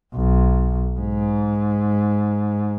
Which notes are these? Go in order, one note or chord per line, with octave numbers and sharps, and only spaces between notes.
B1
G#2